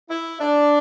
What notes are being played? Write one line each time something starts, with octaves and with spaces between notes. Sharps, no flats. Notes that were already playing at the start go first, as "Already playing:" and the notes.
E4
D4